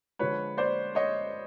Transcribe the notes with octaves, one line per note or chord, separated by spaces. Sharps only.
D3 F3 G#3 B4 C#5
C5 D5
C#5 D#5